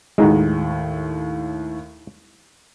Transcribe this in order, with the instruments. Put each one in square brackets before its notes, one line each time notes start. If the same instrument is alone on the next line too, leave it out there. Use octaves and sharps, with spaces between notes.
[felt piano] D#2 A2 [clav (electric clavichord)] G#3 D#4 F#4